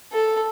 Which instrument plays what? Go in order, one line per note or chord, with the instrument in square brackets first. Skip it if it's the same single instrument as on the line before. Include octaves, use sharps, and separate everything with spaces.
[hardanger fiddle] A4